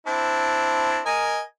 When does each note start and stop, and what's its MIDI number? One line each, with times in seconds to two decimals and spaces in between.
0.07 0.99 60
0.07 0.99 62
0.07 0.99 64
1.06 1.40 70
1.06 1.40 75
1.06 1.40 80